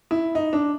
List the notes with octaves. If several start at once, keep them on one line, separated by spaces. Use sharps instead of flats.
E4
D#4
D4